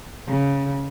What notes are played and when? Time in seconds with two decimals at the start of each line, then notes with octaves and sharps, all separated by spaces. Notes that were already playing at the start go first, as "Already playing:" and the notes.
0.28 C#3